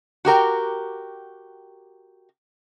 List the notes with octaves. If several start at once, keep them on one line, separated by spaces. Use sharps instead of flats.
F#4 G4 A#4 G5